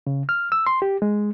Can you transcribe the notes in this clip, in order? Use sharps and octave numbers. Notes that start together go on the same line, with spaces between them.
C#3
F6
E6
C6
G4
G#3